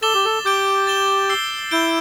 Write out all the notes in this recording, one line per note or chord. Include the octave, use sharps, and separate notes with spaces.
A4 D6 A6 E7 G7
G4
A4
G4 D6 G6 D7 G7
A6 E7 G7
E6 C7 G7
E4 G6 D7 G7